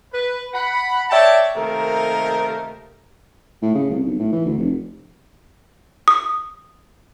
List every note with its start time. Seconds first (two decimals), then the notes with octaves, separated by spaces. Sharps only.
0.12 B4
0.54 F#5 B5
1.10 C#5 D5 E5 G5 A5
1.55 C3 D#3 A3 A#3 D#4 A#4
3.62 A2
3.75 C#3
3.90 C2
4.06 B1
4.19 A2
4.32 E3
4.45 D2
4.58 F1
6.08 D#6